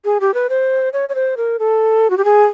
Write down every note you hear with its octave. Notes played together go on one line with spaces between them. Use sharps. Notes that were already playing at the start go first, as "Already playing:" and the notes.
G#4
G4
B4
C5
C#5
C#5
C5
A#4
A4
F#4
G4
G#4